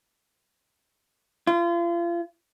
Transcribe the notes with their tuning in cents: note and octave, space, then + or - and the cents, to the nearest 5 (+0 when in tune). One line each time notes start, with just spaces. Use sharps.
F4 -35